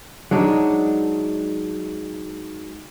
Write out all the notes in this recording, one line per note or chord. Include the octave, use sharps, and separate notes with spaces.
F#3 G#3 D4 D#4